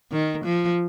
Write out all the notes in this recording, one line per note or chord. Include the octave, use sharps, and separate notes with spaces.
D#3
F3